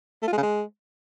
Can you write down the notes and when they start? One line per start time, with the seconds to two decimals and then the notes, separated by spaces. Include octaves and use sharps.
0.22 A3
0.27 F4
0.32 G#3
0.37 C#3
0.43 G#3